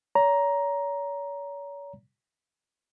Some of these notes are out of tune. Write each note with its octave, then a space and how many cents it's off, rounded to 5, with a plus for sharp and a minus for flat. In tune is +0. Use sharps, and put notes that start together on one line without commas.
C#5 +40 A#5 +10